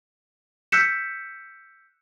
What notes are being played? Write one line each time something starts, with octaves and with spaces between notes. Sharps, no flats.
E6 F#6 G6 B6 C#7 E7